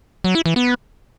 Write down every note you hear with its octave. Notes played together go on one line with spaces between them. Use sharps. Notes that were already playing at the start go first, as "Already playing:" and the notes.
F#3
E4
E3
B3